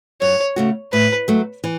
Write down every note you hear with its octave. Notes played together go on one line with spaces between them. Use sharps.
F#2 C#5
C#3 A3 F#4
A2 B4
F#3 A3
E3